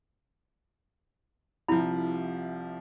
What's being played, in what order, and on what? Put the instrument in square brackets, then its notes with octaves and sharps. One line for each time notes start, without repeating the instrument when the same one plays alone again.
[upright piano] C2 C3 F3 [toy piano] E4 B5